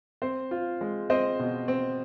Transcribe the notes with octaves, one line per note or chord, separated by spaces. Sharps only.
C4 C5
F4
G#3
C4 C5 D#5
B2
C4